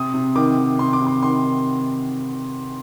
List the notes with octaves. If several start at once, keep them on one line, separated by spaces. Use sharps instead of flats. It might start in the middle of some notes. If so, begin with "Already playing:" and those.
Already playing: C3 D#6
C3
D#3 D6
D#3
C3 C6
D6
C3
C6
D#3 C6